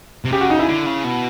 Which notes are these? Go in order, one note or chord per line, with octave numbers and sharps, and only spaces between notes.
C3
C#3 G4
F#4
D#4
E4
D3
C#3
B2